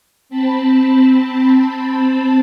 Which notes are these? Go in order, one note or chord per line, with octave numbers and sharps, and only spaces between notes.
C4 A5 B5